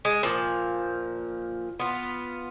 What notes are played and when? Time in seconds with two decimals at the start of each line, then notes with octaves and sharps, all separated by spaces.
0.05 G#3
0.23 A#2 F3
1.80 B3 F4